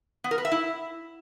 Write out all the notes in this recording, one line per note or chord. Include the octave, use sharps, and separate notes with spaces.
B3
A#4
B4
E5
E4